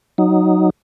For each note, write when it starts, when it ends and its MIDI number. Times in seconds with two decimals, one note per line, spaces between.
0.18 0.70 54
0.18 0.70 63